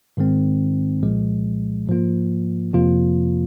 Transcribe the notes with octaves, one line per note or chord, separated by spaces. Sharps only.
G#2 D#3 G#3 C4
C2 A#2 F3 G#3
G#2 F3 A#3 F4
F2 C3 F3 A#3 F4